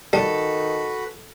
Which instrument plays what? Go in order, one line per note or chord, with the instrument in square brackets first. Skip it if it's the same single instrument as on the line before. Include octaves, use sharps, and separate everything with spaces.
[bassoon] D#3 [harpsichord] G3 [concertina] F#4 B4 [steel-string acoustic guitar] A4